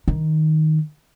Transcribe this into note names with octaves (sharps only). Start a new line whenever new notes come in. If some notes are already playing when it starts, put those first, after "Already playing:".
D#3